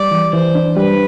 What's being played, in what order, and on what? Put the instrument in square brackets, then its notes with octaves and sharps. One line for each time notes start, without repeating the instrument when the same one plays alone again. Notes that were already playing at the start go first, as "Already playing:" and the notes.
Already playing: [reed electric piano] G3 [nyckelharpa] D5
[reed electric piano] E3
[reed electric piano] E3 [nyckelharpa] C5
[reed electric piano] D4
[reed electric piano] G3 [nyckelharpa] B4